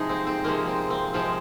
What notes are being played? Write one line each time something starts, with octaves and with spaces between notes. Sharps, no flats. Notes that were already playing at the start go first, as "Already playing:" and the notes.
Already playing: C3 F3 G#3 D#4 G#4
C4
C4
C3 F3 G#3 A#3
C4
C4
C3 F3 G#3 C4